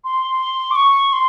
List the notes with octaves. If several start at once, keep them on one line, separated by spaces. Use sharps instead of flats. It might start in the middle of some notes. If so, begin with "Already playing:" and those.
C6
D6
C#6
C6